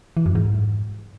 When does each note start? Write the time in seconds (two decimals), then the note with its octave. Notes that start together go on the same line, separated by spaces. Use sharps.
0.17 E3
0.26 F#2
0.35 G#2